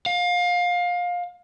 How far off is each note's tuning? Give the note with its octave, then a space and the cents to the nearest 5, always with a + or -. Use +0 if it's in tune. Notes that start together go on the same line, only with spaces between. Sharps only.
F5 +25